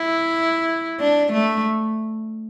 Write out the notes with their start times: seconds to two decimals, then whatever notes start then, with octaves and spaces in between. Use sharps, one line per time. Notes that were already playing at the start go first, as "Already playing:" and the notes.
Already playing: E4
1.00 D4
1.33 A3